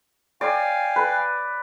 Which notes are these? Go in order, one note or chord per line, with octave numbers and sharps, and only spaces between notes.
D5 F5 G5 G#5
B4